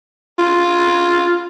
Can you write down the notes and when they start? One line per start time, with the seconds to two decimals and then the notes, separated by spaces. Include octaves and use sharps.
0.39 F4